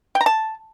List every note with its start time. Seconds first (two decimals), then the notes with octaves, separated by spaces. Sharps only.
0.15 G5
0.21 A#5
0.26 A5